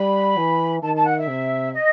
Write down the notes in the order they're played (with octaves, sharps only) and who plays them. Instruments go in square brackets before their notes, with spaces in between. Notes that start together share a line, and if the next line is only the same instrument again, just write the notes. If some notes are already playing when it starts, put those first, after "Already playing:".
Already playing: [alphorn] G3 [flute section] B5
[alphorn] E3
[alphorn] D#3 [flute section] A5
[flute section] A5
F#5
E5
[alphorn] C3
[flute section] D#5